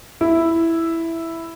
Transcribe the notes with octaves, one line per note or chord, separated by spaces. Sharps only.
E4